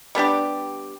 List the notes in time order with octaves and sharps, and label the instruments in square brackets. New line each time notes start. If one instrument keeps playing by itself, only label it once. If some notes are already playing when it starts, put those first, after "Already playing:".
[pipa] G3 B3 D4 G4